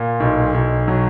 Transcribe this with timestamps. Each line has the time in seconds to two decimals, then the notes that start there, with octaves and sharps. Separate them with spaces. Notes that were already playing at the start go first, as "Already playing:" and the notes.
Already playing: A#2
0.20 B1
0.54 B1
0.88 F#3